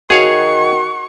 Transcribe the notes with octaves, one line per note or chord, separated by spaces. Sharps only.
D#3 F#4 G#4 C#5 F5 C#6